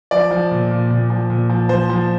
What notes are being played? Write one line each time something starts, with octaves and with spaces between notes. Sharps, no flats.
F3 D5
F3
A#2
A#2
A#2
F3
A#2
F3
F3 C5
F3